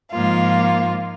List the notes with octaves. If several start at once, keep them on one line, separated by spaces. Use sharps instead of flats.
G#2 F3 A#3 F4